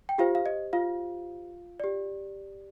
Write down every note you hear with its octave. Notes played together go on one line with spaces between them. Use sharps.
G5
F4 G4 C5 F5
F5
D#5
F4 F5
G4 D5